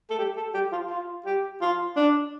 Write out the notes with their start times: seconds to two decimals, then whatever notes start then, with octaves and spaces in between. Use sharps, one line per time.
0.10 A4
0.18 G4
0.37 A4
0.54 G4
0.72 F4
0.90 F4
1.26 G4
1.61 F4
1.96 D4